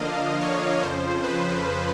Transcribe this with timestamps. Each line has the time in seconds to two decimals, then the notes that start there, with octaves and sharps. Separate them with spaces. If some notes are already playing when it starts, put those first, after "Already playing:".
Already playing: D3 F3 A#3 D4 D#5 F5
0.41 C#5
0.83 F2 C#3 F3 C5
1.24 B4